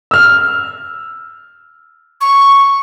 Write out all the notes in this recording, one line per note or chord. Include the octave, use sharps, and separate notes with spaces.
E6 F6
C#6